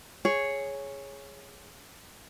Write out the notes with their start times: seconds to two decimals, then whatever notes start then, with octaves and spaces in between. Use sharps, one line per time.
0.25 G#4 C#5